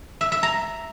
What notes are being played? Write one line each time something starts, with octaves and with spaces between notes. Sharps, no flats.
E5
E5
A#5